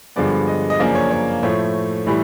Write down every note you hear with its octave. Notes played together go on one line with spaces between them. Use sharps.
G2 D3 F3 G#3 B3 D5
D#5
D#5
F#2 C#3 F3 A#3 D4 D5
C#5
C#5
A2 F3 A3 C#5
A2 E3 G3